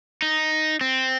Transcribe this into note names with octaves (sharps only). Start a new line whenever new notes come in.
D#4
C4